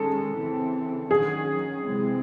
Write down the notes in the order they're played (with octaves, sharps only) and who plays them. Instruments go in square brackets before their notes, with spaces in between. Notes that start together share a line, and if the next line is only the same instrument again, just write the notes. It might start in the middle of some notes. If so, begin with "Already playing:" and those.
Already playing: [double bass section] D#3 G#3 C#4 [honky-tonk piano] A4
[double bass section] C#3 E3 C4
[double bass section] D#3 F#3 C#4 [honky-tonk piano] G#4
[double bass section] C3 E3 G#3 C4